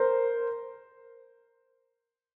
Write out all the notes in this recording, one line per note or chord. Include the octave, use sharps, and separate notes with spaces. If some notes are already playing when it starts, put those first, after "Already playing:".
Already playing: A#4 C5